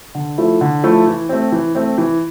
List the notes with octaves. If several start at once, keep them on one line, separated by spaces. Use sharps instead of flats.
D3
F3 A3 E4 A4
D3
F3 A3 E4 A4
E3
A3 C4
E3
A3 C4
E3